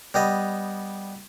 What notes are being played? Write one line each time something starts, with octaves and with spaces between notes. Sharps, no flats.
G3 B3 D#5